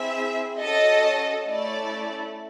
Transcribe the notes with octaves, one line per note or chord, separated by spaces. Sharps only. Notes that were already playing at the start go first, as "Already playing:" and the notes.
Already playing: C4 E4 G#4 E5
C#4 F#4 A4 D#5
A3 C#4 E4 D5